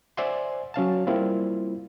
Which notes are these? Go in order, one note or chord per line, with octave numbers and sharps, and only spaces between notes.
C5 D5 E5 F#5 G#5 C6
F#3 C#4 F5 A5
G3 A#3 C4 E4 F4